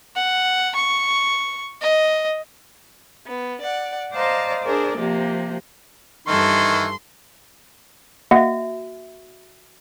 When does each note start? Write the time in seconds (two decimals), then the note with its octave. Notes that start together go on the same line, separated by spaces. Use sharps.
0.16 F#5
0.76 C#6
1.81 D#5
3.27 B3
3.61 D5 F#5
4.12 C5 D5 D#5 F5 A5 A#5
4.64 D4 G#4 A#4 C5 D5
4.97 C3 F3 A#3 G4
6.27 G2 D#3 E3 A4 C6 C#6
8.31 A#3 F#4 D#5 E5 F#5